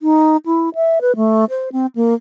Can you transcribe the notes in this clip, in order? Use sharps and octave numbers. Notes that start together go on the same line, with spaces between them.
D#4
E4
E5
B4
A3
C5
C4
A#3